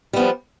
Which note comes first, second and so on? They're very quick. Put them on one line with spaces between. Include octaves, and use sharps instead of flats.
G3 B3 F3